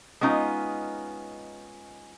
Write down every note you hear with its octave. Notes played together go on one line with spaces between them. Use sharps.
G#3 B3 C#4 D#4 F4